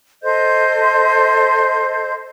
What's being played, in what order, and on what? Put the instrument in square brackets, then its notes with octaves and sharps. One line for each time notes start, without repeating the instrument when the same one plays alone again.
[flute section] A4 C5 D#5 G6